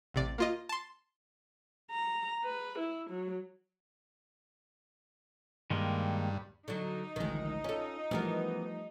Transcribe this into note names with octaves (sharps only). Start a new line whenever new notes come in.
A1 C3 D5
A#3 F4 D#5
A5 C6
A#5
B4
E4
F#3
G2 D#3 G#3 A#3
D3 F#3 D#4
A1 D2 D#3 F3 G#3
C#4 F4 A4
E3 F3 G3 A3 B3 A#4